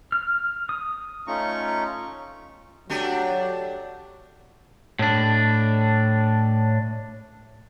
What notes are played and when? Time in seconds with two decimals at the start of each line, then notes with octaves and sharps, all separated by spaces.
0.12 F6
0.69 D#6
1.27 A3 C#4 D#4 F4 A#5 C#6
2.90 F#3 A3 D4 G4
4.99 A2 D4